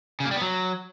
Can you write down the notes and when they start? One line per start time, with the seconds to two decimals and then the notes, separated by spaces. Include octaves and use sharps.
0.20 C#3
0.26 A#3
0.31 G3
0.36 B3
0.41 F#3